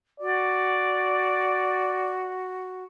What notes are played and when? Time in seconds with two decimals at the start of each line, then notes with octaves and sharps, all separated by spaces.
0.20 F#4 D5